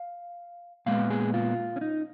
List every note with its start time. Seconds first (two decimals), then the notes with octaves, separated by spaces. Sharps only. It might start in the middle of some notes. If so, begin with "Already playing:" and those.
Already playing: F5
0.86 A#2 G#3 B3 F5
1.10 G#4
1.34 F4
1.76 C#4
1.81 D#4